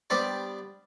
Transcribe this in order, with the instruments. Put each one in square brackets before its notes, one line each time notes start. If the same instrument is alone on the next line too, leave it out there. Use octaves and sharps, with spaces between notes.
[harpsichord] G3 B3 D4 G4 C5 D5